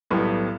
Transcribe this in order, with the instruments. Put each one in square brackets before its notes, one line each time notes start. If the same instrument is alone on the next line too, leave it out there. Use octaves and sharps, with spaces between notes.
[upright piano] B1 A2 G3 B3